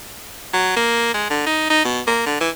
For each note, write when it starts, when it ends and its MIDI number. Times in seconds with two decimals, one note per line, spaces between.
0.53 0.73 54
0.76 1.14 58
1.14 1.28 56
1.30 1.45 50
1.47 1.67 63
1.70 1.83 63
1.85 2.01 47
2.07 2.24 58
2.26 2.36 50
2.41 2.49 52